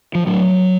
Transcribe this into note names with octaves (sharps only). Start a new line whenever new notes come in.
F3
A2 F#3